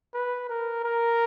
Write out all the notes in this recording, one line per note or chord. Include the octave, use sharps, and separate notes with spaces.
B4
A#4
A#4